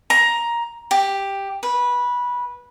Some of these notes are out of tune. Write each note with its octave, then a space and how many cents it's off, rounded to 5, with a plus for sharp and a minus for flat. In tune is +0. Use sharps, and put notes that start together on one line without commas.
A#5 +10
G4 +5
B4 -15